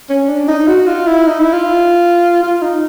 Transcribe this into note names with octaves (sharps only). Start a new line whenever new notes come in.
C#4
D4
D#4
F#4
F4
E4
D#4
E4
F4
F4
D#4